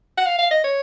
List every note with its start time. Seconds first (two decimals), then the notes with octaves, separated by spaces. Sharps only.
0.17 F#5
0.26 F5
0.38 F5
0.51 D#5
0.64 C#5